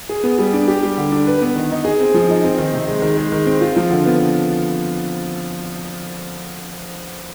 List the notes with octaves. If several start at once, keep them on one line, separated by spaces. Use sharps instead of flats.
G#4
B3
G3
D4
G4
G3
D3
D4
B4
B3
D#3
D#4
G#4
C4
F3
D#4
C4
D#3
C3
G#3
D#3
G#3
D#3
C4
F4
F3
D3
B3